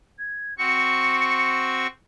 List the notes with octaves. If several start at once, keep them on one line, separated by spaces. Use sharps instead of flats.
G#6
C4 F#4 C#6 C#7